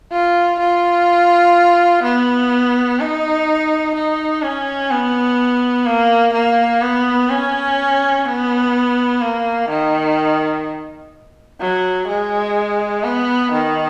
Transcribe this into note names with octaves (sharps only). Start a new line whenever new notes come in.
F4
F4
B3
D#4
D#4
C#4
B3
A#3
A#3
B3
C#4
B3
A#3
D#3
F#3
G#3
B3
D#3